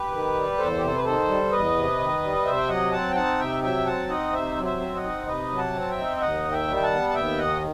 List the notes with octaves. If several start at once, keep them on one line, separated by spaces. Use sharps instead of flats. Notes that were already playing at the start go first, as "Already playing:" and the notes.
Already playing: G4 B4
D#3
G3
E2 A4 C5
C3 G4
A4
B4
D#3 A4 C5
G3
E2 B4 D#5
C3
D#3
G3
C3 C5 E5
G5
F#3 D#5 F#5
C4 F#5 A5
G5
D#4 F#5 A5
C3 E5 G5
F#3 E5 G5
C4 F#5 A5
D#4 D#5 F#5
C3 C5 E5
F#3
C5 E5
C4
D#5 F#5
D#4
C3 B4 D#5
F#3
F#5 A5
C4
A5
E5 G5
D#4
E5
D#2 D#5 F#5
D#3
E5 G5
G3
G5
F#5 A5
B3
A5
D#2 E5 G5
D#3 D#5 F#5